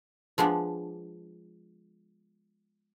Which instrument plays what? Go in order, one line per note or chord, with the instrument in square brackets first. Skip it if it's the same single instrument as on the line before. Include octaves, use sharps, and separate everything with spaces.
[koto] F3 G#3 B3 D4